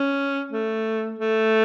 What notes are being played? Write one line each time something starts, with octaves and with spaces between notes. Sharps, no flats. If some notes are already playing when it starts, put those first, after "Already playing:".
Already playing: C#4
A3
A3